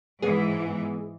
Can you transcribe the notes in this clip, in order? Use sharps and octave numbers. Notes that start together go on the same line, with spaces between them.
G#2 E3 B3 G#4